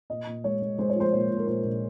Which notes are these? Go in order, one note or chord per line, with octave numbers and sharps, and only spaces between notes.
A#2 D#5
A#2
G#3 C#5
G#3
G#3 C5
C#5
F3 C5
A#2 C#5
A#2
A#4
A#2 C5
A#1